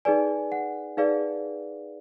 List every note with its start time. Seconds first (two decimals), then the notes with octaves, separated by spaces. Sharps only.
0.05 D#4 G#4 B4 D5 G#5
0.52 F#5
0.97 D#4 G#4 B4 D5 F5